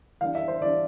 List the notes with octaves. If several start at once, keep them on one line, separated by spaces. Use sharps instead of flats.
E3 G3 D4 F5
E5
C5
E3 G3 D4 D5